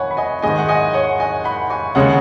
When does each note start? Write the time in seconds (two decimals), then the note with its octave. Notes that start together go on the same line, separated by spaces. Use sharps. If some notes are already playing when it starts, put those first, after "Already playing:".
Already playing: C#5 F#5 G#5 B5
0.11 B5
0.17 D#5 G#5
0.42 G#2 D#3 G#3 D#5 G#5
0.58 F#5
0.68 D#5 G#5
0.93 C#5 F#5
1.20 D#5 G#5
1.44 F#5 B5
1.70 G#5 C#6
1.95 D#2 C#3 G#3 C#5 F#5